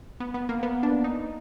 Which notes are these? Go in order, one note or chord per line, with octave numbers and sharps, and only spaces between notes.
B3
B3
A#3
B3
D4
D#4